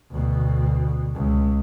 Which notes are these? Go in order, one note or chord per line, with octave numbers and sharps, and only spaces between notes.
D2 B2
C#2